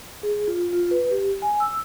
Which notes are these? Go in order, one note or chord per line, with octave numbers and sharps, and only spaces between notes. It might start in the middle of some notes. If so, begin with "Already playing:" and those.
G#4
F4
F4
B4
G4
G#5
E6